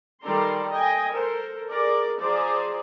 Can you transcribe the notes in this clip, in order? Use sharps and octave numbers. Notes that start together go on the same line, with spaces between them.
D#3 G3 A4 D5 A#5 C6
D#5 G5 G#5
A4 A#4 C5
G#4 A#4 D5
F3 G#4 C5 D5 A#5